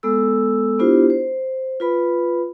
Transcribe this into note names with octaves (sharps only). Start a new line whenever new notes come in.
G#3 B3 A4 E6
B3 D4 E4 F4 G4 C5
C5
F4 B4 B5